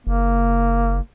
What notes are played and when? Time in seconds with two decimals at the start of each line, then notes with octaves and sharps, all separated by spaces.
0.07 F#1 A#3